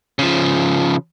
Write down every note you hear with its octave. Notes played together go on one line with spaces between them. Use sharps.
C#3 F3